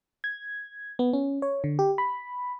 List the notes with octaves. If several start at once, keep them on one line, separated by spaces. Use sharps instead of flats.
G#6
B3
C#4
C#5
D3
G4
B5